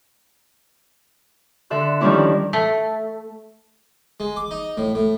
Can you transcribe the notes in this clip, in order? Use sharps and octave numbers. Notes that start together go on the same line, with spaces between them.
D3 A4 E5 C6 F#6
D#3 F3 G3 C#4 D4 E4
A3
G#3
D6
D#4
A2
A2